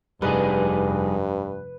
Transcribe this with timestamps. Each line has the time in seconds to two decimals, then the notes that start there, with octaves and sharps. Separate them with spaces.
0.22 F1 G2 G3 D#4 G#4 B4